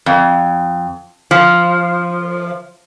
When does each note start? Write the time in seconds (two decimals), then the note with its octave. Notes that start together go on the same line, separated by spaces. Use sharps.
0.06 F2
1.31 F3